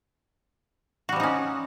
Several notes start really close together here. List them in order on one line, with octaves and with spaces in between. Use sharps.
F#4 G3 F3 D#4 C#4